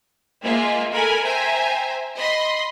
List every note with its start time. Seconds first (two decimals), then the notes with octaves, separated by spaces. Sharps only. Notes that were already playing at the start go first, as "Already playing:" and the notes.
0.43 G#3 A#3 F4 E5
0.92 A4 A#4 G#5 B5
1.24 C5 E5 G5 G#5 A#5
2.16 D#5 B5 C6